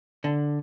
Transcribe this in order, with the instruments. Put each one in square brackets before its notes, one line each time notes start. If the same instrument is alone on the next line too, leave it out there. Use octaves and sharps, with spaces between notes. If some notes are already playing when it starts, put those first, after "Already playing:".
[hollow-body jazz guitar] D3